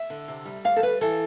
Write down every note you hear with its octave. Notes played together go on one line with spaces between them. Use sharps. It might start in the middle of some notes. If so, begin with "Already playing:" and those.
Already playing: E5
D3
C3
G3
D2 F5
A4
G3 B4
E3 A4